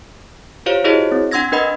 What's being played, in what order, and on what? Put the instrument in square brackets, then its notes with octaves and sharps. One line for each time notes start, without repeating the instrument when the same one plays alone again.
[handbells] F4 G4 C5 C#5 F5
E4 F#4 G#4 C5 C#5 D#5
C4
D4 F#5 C6 E6 G#6 A#6
D4 A#4 B4 D#5 F#5 B5